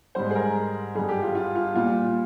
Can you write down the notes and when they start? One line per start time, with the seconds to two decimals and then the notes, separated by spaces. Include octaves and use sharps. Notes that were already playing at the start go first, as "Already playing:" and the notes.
0.15 G#2 G3 C5
0.30 G#4
0.35 A#4
0.95 G2 G3 G#4
1.09 G4
1.22 F4
1.35 F4
1.55 F4
1.75 A#2 G3 F4